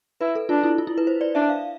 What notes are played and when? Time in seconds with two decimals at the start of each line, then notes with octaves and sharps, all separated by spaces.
0.21 E4 B4
0.35 A4
0.49 D4 F4
0.63 E4
0.78 F4
0.87 E4
0.98 B4
1.07 C5
1.21 D5
1.35 D4 E5
1.49 F5